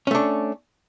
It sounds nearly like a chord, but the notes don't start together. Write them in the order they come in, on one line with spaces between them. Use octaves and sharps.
C#4 A3 D4